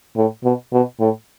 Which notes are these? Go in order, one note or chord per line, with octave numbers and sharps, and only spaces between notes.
A2
B2
B2
A2